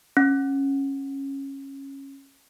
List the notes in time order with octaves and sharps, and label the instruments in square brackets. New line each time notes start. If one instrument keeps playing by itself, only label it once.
[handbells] C#4